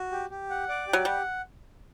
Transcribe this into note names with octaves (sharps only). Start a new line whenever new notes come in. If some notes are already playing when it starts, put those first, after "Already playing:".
Already playing: F#4
G4
G4
F#5
D5
G4
F#3
G3 F#5